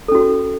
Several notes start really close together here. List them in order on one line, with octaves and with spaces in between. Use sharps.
A4 C#4 F#4